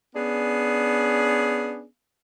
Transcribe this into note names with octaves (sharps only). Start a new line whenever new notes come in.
B3 C#4 D4 G#4